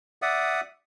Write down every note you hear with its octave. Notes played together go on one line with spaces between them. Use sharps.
D5 E5 F#5 D#6